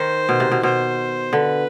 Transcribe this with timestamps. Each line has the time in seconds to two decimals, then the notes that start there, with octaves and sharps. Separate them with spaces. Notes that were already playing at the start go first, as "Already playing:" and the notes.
Already playing: D#3 C5
0.29 B2
0.40 C3
0.51 B2
0.63 B2 C5
1.33 D3 B4